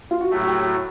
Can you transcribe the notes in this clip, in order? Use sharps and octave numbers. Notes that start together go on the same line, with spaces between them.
F4
F#4
A2 F#3 A3 G4
F#4
G4
F#4